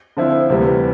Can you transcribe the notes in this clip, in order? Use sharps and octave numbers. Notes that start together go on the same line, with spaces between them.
D3 F3 C4 E4
D2 C3 E3 G3